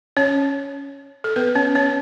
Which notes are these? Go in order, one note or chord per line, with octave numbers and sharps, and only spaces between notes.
C#4 C#5
A4
B3 B4
C#4 C#5
C#4 C#5